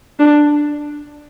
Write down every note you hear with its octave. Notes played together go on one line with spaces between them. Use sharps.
D4